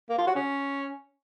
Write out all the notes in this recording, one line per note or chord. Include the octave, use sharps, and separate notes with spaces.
A#3
F4
F#4
C#4